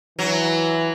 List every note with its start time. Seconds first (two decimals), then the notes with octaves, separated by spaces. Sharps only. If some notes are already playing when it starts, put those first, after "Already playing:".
0.19 E3 F#3